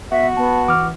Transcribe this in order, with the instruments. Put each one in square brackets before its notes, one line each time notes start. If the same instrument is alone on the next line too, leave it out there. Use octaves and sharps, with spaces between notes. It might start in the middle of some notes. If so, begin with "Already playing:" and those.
[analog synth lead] B3 [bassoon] F#4 [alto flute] E5
[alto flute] B3 [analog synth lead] A5
[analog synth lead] E3 [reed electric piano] D6 F6